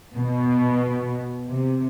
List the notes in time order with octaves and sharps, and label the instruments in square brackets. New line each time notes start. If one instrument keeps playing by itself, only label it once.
[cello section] B2
C3